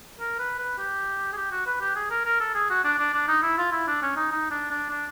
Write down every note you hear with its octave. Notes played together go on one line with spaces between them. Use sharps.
A#4
B4
B4
G4
G#4
G4
F#4
B4
G4
G#4
A#4
A#4
A4
G#4
F#4
D4
D4
D4
D#4
E4
F4
E4
D4
C#4
D#4
D#4
D4
D4
D4